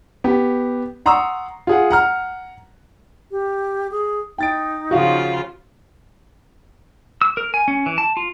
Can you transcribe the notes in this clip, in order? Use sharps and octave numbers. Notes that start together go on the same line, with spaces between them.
B3 G4
F#5 A#5 C6 C#6 D#6 E6
F4 G#4 F#5
F#5 A#5 F6
G4
G#4
D#4 G5 A6 D7
C#3 F3 F4 F#4 F5
E6
A#4
G#5
C#4
E3
A5
F4